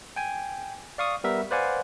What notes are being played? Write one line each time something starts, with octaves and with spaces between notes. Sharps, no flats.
G5 G#5
D5 F5 C#6 D#6
G3 B3 A#4 E5
B4 C5 D5 F5 F#5 G#5